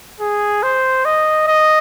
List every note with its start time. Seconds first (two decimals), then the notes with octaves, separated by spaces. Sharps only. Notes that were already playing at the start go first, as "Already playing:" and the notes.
0.20 G#4
0.63 C5
1.05 D#5
1.47 D#5